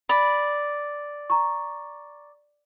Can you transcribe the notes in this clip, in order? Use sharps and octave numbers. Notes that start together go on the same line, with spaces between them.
D5 B5
A#5 C#6